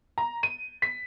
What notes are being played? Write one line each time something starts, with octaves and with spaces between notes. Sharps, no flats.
A#5
D#7
B6